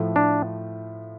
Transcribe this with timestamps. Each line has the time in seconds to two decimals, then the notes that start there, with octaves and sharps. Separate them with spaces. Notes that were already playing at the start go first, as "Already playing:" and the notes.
Already playing: A2 F3 A3
0.16 D4